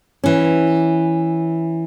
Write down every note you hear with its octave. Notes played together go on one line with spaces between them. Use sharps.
E3 C#4